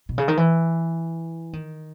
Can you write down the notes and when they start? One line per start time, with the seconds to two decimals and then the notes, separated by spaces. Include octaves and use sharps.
0.09 B2
0.18 C#3
0.28 D#3
0.37 E3
1.53 D#3